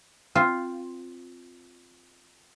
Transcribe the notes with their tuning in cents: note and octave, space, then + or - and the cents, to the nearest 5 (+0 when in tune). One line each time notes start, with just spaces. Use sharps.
C4 +0 F4 +0